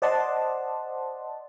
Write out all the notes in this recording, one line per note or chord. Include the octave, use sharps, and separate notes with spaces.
C5 D5 D#5 F#5 A5 C6